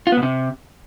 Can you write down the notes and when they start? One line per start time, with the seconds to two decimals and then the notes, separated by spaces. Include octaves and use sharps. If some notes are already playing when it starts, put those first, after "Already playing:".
0.07 F4
0.12 B3
0.17 B2
0.23 C3